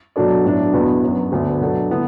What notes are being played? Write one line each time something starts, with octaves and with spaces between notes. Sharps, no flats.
B2 F#3 D4 A4 D5
A2 F#3 B3 D4
E2 B2 B3 E4 B4
F#2 F#3 B3
D2 D3 B3 D4
B2 F#3 D4 F#4 A4
D3 B3 E4